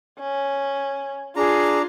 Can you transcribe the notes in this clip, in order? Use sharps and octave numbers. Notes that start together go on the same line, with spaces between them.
C#4
D4 F4 G#4 A#5